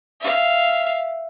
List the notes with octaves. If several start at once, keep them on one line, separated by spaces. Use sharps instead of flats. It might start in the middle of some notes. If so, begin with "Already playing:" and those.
E5 F5